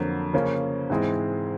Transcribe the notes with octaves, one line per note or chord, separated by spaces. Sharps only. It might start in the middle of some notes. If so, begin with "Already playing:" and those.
Already playing: F2 D3 F#3 A#3
C#3 F3 A#3 C#4
G#2 E3 G#3 C4